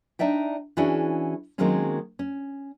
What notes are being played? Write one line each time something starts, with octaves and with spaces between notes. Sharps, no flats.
D4 D#4 D5 E5 G5
E3 C#4 D4 E4 F#4 G#4
D#3 F#3 G#3 A#3 C4 C#4
C#4